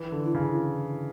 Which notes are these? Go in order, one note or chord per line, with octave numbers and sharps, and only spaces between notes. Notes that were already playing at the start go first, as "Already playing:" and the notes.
Already playing: E3
D3
E4
C#3